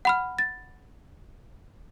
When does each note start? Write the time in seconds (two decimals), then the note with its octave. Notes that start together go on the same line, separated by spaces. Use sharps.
0.05 F#5 B5 F6
0.39 A6